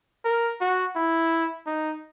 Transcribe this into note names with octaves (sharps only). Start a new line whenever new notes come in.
A#4
F#4
E4
D#4